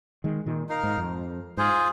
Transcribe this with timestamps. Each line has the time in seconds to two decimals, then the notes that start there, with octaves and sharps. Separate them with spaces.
0.24 D#3 G#3
0.46 A#2 D#3
0.69 D#4 A#4 F5
0.83 G#2
0.97 F2
1.57 G#2 F4 G#4 C5